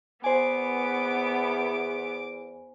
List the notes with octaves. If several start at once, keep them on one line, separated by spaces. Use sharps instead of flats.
E2 B3 C5 G#5 D6